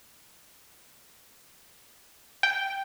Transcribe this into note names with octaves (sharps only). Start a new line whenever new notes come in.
G5